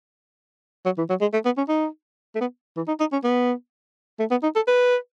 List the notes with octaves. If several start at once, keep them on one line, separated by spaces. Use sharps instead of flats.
F#3
E3
F#3
G#3
A3
B3
C#4
D#4
A3
B3
E3
D#4
D#4
C#4
B3
A3
B3
D#4
A4
B4